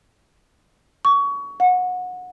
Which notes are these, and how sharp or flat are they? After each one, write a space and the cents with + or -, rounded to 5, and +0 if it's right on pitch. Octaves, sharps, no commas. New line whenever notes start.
C#6 +25
F#5 -25